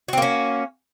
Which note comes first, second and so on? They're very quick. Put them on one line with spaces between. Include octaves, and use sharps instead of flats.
F#4 C4 A#3 C#4